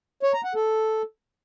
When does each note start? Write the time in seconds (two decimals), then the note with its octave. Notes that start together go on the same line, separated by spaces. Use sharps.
0.23 C#5
0.34 A#5
0.44 F#5
0.55 A4